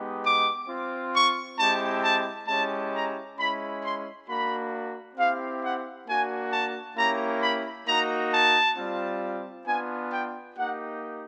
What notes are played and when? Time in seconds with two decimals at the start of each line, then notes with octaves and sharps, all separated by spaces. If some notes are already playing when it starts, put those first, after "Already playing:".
Already playing: G#3 B3 D#4 G4
0.23 D6
0.67 C4 F4
1.12 C#6
1.57 G#3 C4 E4 G4 A5
2.01 A5
2.47 G#3 C#4 E4 G4 A5
2.91 A#5
3.37 G#3 C#4 E4 B5
3.81 C6
4.27 A#3 D4 F#4 B5
5.16 C4 E4 G4 F5
5.61 F#5
6.06 A#3 D4 F#4 G#5
6.51 A5
6.96 A#3 C#4 E4 G4 A#5
7.40 B5
7.85 A#3 D#4 F#4 A#5
8.30 A5
8.76 G3 C4 F4
9.65 B3 D4 F4 G#5
10.10 G5
10.55 A#3 D#4 G4 F#5